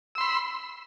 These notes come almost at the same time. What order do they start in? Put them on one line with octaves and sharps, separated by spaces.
E6 C6 B5